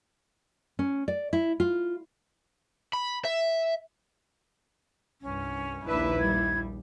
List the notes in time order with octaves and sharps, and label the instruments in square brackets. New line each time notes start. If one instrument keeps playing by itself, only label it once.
[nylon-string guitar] C#4
D5
E4
F4
[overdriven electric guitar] B5
E5
[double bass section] C2 G2 [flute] C#4
[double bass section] A#1 D#2 [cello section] D4 B4 E5 [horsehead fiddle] E4
[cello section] G3 [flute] G#6